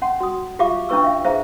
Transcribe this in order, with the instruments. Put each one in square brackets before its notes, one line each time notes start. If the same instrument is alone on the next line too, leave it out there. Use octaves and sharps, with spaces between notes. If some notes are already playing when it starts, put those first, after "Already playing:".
[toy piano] C#4 F#5 C6
F#4 D#6
F4 G4 E5 F5 D6
C#4 D4 E4 B4 C#6 E6
E5 F5
E4 G#4 C5 E5 F5 A#5